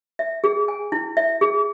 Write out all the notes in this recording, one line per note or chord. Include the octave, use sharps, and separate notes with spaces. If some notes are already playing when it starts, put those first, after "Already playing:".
E5
G#4
G#5
E4
E5
G#4